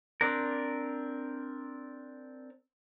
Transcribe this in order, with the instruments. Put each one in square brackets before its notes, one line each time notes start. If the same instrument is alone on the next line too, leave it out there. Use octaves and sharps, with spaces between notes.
[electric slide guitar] C4 D4 A#4